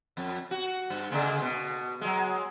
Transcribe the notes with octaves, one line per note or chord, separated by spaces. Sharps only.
F2
F#4
G2
C#3 G#3 A#3
B2
F#3 G#3